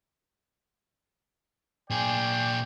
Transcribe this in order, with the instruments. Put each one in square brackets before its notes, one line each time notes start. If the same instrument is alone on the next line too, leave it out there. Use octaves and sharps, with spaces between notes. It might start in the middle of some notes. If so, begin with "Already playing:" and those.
[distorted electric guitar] A#2 G#4 [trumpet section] D5 G5 [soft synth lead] G#5